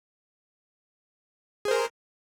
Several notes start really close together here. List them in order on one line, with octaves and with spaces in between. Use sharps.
G#4 C5 A#4